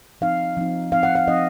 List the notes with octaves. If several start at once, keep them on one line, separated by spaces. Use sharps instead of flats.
F3 C4 D#4 F5
F3 C4 D#4
F3 C4 D#4 F5
F#5
F5
F3 C4 D#4 D#5